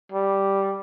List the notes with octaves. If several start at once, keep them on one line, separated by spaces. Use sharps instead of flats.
G3